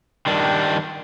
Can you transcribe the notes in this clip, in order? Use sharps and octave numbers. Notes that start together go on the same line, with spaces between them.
D#3 G3 D4